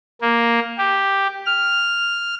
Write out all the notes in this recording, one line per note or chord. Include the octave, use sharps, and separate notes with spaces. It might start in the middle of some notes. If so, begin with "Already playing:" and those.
A#3
G4
F6